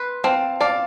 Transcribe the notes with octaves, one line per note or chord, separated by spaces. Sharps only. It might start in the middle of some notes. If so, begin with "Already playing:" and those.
Already playing: B4 C6
C4 F5 A5
D5 F5 A5